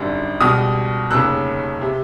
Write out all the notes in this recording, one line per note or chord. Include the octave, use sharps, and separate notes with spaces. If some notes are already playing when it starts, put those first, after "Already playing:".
Already playing: G#1 F#2 D3 G3
C#2 B2 G3 D#6 F6
F1 D#2 C#3 E6 F#6
C3